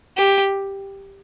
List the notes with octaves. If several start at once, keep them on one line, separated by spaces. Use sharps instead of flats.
G4